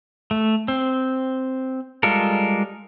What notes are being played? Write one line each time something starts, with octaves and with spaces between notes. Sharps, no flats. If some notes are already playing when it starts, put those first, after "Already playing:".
A3
C4
G3 G#3 F4 A4 A#4